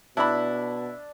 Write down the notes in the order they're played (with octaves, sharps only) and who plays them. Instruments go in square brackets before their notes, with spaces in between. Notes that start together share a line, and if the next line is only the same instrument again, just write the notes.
[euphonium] B2 [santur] D4 [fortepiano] E4 B5